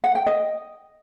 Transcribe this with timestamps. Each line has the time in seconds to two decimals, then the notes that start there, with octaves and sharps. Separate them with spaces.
0.04 F#5
0.15 G5
0.26 D#5